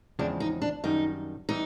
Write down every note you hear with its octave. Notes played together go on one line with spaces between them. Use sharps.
E2 C#3 F3 G#3 C4 D4
D#4
D4
F#2 D#3 G3 D#4
E3 G3 D#4